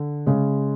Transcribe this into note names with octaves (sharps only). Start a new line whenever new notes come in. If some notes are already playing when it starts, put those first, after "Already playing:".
Already playing: D3
C#3 G#3